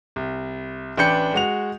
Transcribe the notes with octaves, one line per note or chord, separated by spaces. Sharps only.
C2
A1 D4 B4 G5 G6 C#7
G#3 F#4 F7